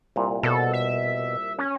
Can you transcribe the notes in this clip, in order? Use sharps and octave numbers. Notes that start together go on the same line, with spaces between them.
C2 A#2
B2 A4
E5
C#4